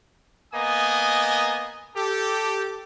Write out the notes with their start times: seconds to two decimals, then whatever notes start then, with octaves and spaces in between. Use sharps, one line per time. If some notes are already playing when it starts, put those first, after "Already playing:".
0.53 A#3 B3 D#5 G#5 D#6
1.96 G4 A4